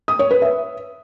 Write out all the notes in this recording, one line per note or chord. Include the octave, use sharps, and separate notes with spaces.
D#6
C#5
B4
E5